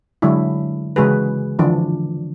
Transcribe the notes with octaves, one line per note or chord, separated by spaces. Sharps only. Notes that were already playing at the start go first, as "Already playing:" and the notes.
D3 F#3 G#3 D4 E4
C#3 E3 G#3 F#4 G#4 B4
D3 E3 F3 D4